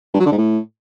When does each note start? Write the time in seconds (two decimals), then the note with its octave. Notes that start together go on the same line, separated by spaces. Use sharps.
0.14 G2
0.20 F#3
0.26 D3
0.32 G#2
0.38 A2